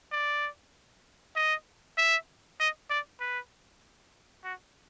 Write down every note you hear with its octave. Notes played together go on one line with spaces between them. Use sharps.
D5
D#5
E5
D#5
D5
B4
F#4